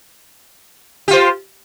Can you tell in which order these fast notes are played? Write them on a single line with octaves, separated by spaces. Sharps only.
G4 F4 C5